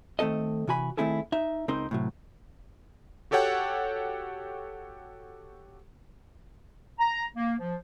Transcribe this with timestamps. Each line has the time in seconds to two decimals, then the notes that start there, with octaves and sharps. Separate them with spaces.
0.19 D#3 A3 C4 A4 D#5
0.67 C3 E3 F#4 G#5 B5
0.97 D#3 A3 C4 E4 G#4 A4
1.32 D#4 E5
1.68 C#2 C4 D#4 A#4 C5
1.91 A2 C3 F#3
3.31 F#4 G4 A4 C#5 F#5 G5
6.99 A#5
7.37 A#3
7.60 F3